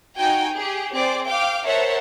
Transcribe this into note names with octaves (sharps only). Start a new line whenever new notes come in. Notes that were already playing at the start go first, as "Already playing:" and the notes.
D#4 F#4 G5 G#5
G4 G#4
C4 G#4 C5 D5 D6
F5 G5 D6
A#4 C5 C#5 E5 F#5 A5